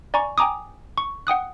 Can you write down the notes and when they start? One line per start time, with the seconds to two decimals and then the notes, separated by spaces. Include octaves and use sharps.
0.14 D5 G#5 A#5 C#6
0.38 G5 G#5 A#5 D6 D#6
0.98 C#6
1.27 F#5 G5 D#6 F#6